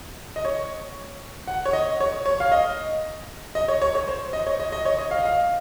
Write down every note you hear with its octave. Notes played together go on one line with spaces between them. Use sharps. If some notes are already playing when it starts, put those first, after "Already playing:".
D#5
C#5
F#5
C#5
D#5
C#5
C#5
F5
D#5
D#5
C#5
C#5
C#5
C5
D#5
C#5
D#5
D#5
C#5
D#5
F5
D#5
F5